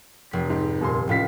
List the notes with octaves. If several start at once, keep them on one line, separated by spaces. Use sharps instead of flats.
F1 B6
G#2
D#1 A#2 C6
F1 C#2 A2 F4 B6